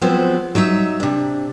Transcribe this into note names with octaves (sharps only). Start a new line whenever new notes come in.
F3 F#3 G#3 B3 C4
F#3 D#4 C#5 E5
C3 D4